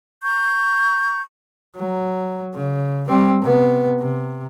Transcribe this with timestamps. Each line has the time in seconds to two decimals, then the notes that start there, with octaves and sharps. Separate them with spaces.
0.23 A#5 C#6 G6
1.76 F#3
2.54 C#3
3.08 G3 C4
3.42 C3 B3
4.00 C3